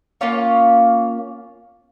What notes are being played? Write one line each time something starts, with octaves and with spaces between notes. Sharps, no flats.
A#3 C#4 F4 C#5